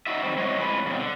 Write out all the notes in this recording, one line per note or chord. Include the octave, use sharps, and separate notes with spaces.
D#4 F#4 E5
D#3 G3 C4
G#3 C4 E4 F#4 C#5 D#5
F2 A2 G#3 C#4 D4 B4
G2 B2 E3 F#3 A#3 C4
D3